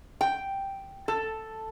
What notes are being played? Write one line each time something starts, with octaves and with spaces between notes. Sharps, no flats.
G5
A4